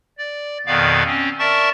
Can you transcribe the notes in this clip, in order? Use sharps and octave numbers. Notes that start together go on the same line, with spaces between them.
D5
F2 B2 D#3 B3 D5 F5
C4 C#4
A#4 D5 E5 A5 C#6 A6